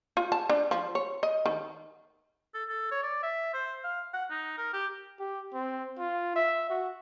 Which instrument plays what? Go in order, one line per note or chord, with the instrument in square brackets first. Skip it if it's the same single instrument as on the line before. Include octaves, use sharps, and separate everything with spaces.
[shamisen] F4
A5
D4
F3
C#5
D#5
D#3
[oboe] A4
A4
C#5
D5
E5
C5
F5
F#5
D#4
A#4
G4
[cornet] G4
C4
F4
E5
F#4